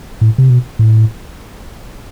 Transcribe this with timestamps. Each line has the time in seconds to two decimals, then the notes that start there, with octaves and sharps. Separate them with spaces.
0.21 A2
0.38 C3
0.50 B2
0.79 A2